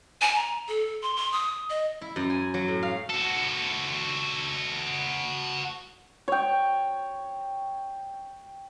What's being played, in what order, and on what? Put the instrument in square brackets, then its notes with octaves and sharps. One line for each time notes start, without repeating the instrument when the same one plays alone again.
[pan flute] G#5
A#5
A4
C6
C6
D#6
D#5
[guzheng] E4
F#2
G#5
F#3
A2
F5
[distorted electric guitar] F#4 A4
[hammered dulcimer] C#5 G5